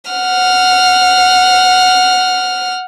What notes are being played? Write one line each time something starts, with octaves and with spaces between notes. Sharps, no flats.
F#5 F6